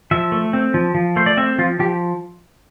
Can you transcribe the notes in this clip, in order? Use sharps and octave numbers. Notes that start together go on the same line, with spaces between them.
F3 E5
A3
C4
F3
F3
A3 C5
D5
C4 E5
F3 F4
F3 G4